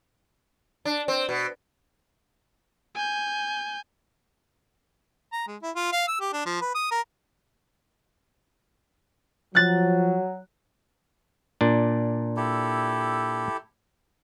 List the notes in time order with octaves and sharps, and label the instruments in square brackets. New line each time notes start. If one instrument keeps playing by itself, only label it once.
[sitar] D4
C4
B2
[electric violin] G#5 G6
[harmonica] A#5
G#3
E4
F4
F5
E6
G4
D4
F3
B4
D#6
A#4
[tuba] F3 [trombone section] F#3 [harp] F#6 A6
[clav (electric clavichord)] A#2 D4
[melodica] E4 G4 A4